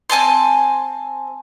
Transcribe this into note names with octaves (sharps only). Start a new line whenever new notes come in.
C4 G#5 A5 C6